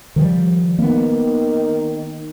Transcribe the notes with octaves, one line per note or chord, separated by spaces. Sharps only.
D#3 F3 G3
D#3 A#3 B3